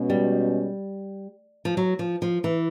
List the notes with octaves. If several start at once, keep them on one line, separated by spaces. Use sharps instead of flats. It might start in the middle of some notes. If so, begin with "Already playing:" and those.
Already playing: B2 G#3 C#4
G3
F3
F#3
F3
F3
E3